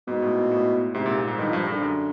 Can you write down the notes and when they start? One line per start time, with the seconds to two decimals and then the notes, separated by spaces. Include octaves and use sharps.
0.07 G#2 B2
0.22 A2
0.37 A#2
0.51 A2
0.94 G#2 C3
1.06 A#2
1.17 A#2
1.27 G#2
1.38 G2 D#3
1.50 G2 F3
1.67 G2 D3
1.82 F#2